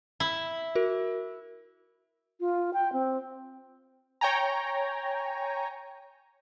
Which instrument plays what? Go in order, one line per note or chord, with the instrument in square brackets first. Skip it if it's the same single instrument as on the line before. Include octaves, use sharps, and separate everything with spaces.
[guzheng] E4
[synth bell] F#4 A#4
[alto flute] F4
G5
C4
[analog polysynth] C#5 G5 G#5 A#5